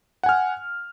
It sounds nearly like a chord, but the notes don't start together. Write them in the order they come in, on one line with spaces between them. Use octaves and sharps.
F#5 G#5 F6